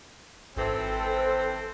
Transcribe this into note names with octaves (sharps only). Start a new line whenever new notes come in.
G#1 E3 C4 A4